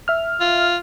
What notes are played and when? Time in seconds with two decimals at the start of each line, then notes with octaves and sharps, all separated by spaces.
0.08 E5 F6
0.40 F4